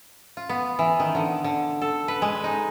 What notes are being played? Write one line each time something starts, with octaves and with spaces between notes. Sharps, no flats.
F4
B3
E3
D#3
D3
D3
A4
B4
G#3
D#4